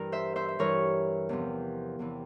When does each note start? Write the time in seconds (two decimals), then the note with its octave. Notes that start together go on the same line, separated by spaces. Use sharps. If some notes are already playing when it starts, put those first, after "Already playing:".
Already playing: G2 E3 A#4
0.12 C5 E5
0.36 C5 E5
0.48 E5
0.59 G2 E3 A#4 C#5
1.29 E2 C3 F3
1.99 E2 C3 E3